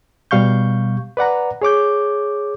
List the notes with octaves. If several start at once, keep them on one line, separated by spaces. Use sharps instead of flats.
B2 G3 F5 C#6 G6
B4 D5 F#5 A#5
G#4 C#5 D6 G6